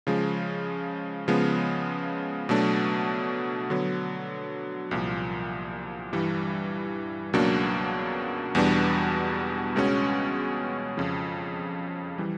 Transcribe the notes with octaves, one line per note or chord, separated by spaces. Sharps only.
C#3 F3 G#3
C#3 F3 G#3 B3
B2 F#3 A3 D4
D3 F#3 B3
C2 A#2 F3
G2 E3 G3
C#2 B2 F#3 A#3 D4
E2 B2 G3 B3 D4
C#2 B2 G#3 C#4 F#4
F2 C#3 F3
E3 G3